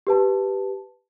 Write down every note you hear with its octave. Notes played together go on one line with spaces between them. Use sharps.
G4 B4 A5